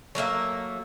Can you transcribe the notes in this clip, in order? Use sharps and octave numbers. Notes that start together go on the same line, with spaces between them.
F#3 A3 A#3 E5